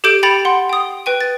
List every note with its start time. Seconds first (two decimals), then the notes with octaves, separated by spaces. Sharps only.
0.04 G4 A4 D6 G6 D7
0.23 G5 B5 A6 C#7 F7
0.45 F#5 C6
0.69 G5 D#6
1.06 B4 G5 D#7
1.21 A6